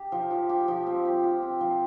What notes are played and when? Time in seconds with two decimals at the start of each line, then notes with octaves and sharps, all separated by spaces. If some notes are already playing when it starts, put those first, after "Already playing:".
Already playing: G4
0.12 F3
0.31 F3
0.49 G4
0.68 F3
0.87 C4
1.05 G4
1.24 F4
1.42 C4
1.61 F3